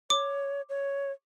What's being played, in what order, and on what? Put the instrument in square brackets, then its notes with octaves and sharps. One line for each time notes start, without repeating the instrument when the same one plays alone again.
[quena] C#5 [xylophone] D6
[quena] C#5